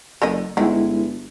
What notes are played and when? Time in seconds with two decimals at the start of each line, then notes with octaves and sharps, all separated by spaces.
0.22 F#1 A4 A#4 D#5
0.57 G1 D#3 G#3 B3 E4